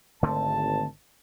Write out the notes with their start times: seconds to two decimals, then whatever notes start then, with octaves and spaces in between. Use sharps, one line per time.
0.23 G#1 D3 A3 C4 A5